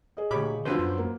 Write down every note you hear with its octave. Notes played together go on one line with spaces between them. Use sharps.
G#4 D#5
D2 A#2 G4 C#5 B5 D6
B1 D3 D#3 F3 F#4 B4 C5
F#2
A#3